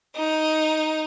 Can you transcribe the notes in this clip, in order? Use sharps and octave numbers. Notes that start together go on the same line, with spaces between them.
D#4